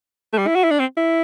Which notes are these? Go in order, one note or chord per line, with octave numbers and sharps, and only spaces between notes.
A3
G3
E4
F#4
E4
D4
C4
E4